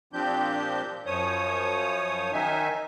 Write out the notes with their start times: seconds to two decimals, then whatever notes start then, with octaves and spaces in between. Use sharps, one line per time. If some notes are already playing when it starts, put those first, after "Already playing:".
0.13 A#2 F3 C4 D4 G4 G6
1.06 F#2 F3 C#5 D#6
2.32 D#3 D#4 E5 G#5